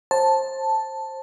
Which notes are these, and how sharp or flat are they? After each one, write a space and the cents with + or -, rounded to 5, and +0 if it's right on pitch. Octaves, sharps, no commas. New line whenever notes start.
C5 +25 A5 +0